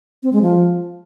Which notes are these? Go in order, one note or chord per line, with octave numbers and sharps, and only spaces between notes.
C4
G#3
F3